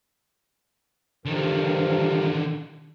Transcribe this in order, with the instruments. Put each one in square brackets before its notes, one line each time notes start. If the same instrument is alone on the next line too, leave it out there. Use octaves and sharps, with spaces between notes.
[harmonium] G2 F3 A#4 [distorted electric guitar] D3 D#3